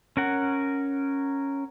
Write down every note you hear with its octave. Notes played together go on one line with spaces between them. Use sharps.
C#4 A#4 F#5